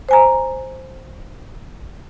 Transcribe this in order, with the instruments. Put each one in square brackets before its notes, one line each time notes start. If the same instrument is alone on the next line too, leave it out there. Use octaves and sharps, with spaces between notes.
[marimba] C5 G#5 A#5